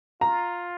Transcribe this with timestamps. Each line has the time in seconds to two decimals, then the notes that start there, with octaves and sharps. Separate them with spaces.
0.21 F4 A#5